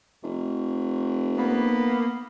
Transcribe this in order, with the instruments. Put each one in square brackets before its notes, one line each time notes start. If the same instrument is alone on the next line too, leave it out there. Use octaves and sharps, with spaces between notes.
[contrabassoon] F1
[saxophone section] A#3 B3